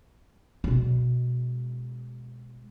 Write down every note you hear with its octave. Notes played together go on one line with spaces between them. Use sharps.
B2 G#3